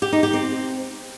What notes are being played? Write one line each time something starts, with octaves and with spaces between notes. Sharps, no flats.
G4
D#4
G4
C4